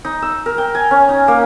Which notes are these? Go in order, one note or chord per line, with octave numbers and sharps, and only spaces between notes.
D#4
E6
A#4
G5
G#5
C#4
D#4
A#3